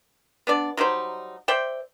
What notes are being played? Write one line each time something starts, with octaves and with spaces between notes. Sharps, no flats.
B3 D4 D5
F#3 G3 D#4 C5
C5 D5 E5 G5